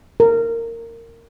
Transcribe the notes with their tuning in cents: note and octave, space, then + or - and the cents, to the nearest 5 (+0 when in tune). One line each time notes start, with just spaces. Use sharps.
A#4 -20